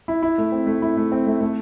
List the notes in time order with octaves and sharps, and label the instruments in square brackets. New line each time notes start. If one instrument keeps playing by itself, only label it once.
[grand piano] E4
E4
A3
C4
A3
E4
A3
C4
A3
A3